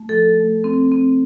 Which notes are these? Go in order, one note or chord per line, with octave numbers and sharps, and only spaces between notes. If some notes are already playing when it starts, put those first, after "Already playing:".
Already playing: A3
F3 A4
A3
C4
C4